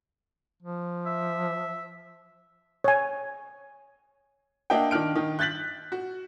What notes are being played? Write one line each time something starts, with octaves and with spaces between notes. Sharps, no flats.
F3
E5
C#5 G#5
A#3 D4 D#5 E5 F#5 G5
D#3 D4 F6 D7
D#3
F#6 G6 A6 B6 F#7
F#4